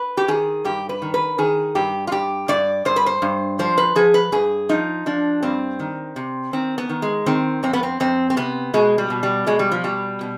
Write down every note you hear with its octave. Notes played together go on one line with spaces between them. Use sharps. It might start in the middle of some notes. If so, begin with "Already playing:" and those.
Already playing: B4
G4
D#3 G#4
G2 G4
B4
D#3
B4
D#3 G#4
G2 G4
F4
G2 G4
G2 D5
G2 C5
B4
C5
G2
F3 C5
B4
F3 G#4
B4
G2 G#4
F3 D#4
F3 D4
G2 C4
D#3
C3
D#3 C4
B3
D#3
G#3
D#3 C4
F2 C4
B3
C4
F2 C4
C4
C3 B3
B2 G#3
G3
B2
G3
B2 G#3
G3
F3
B2 G3
B2